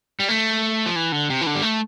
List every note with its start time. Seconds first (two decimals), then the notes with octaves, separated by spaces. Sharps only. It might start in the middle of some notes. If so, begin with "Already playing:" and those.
0.20 G3
0.29 A3
0.86 F3
0.96 E3
1.12 D3
1.30 C3
1.41 E3
1.46 D3
1.55 G3
1.62 A3